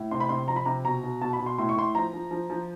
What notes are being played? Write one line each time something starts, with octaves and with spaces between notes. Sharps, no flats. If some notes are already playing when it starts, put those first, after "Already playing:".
Already playing: A2
C3 C6
B5
C3 C6
F3 A#5
B5
C3 A#5
B2 A#5
B2
B2 A5
B5
B2
C6
A2 C6
C#6
A2 C6
F3 A#5
F3
F3
F3